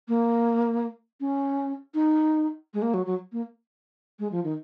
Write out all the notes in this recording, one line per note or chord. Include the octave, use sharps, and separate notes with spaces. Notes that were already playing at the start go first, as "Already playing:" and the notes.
A#3
C#4
D#4
G#3
A#3
F#3
F#3
A#3
G#3
F3
D#3